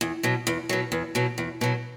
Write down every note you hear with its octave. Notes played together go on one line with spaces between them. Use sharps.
E2
B2 F#3
E2
B2 F#3
E2
B2 F#3
E2
B2 F#3